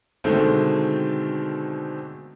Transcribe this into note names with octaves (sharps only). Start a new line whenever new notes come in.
B2 D3 D#3 G#3 A3 C4